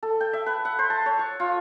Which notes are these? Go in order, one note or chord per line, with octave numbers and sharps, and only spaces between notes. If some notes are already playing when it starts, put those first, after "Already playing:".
A4
G5
E5
B4
F#5
C5
A5
C#5
C#6
F4